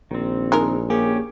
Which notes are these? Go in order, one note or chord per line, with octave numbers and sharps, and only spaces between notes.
A#1 D#3 C4
G#3 D#4 A#4
A#3 C#4 G4 G#4